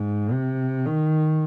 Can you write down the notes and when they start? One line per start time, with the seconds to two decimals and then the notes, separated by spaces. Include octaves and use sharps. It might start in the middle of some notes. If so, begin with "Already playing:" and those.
Already playing: G#2
0.31 C3
0.86 D#3